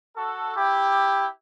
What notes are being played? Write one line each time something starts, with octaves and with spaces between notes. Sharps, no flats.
F#4 A4
E4 G4